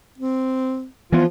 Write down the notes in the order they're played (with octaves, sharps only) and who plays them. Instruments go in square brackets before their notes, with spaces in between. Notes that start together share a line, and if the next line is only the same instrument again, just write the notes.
[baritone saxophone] C4
[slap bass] E3 B3 [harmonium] F3 F4